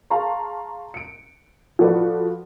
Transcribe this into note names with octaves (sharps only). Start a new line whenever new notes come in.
G#4 F5 A5 A#5 C6 C#6
C#7 D7
F3 F#4 A4 B4 D5